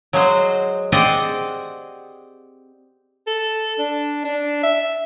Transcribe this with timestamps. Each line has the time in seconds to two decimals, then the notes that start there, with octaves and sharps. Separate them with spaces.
0.13 F#3 G#3 C5
0.92 C4 G4 G#4 D5 D#5 F#5
3.27 A4
3.79 D4
4.24 D4
4.63 E5